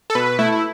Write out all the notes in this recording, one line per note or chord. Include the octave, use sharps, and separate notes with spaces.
A4
B2 B4
A3 E4
E4